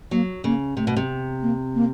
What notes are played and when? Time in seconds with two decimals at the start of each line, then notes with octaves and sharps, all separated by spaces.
0.11 F#3 A#3
0.44 C#3 A#3
0.77 C3 A3
0.87 B2
0.96 C3
1.42 A#3
1.75 A#3